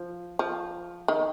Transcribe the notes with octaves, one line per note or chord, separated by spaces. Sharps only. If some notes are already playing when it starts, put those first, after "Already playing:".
Already playing: F3
F3
D#3